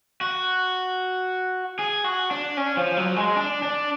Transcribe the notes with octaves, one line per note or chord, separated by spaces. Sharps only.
F#4
G#4
F#4
D4
C#4
F3
F#3
G#3
D4
D4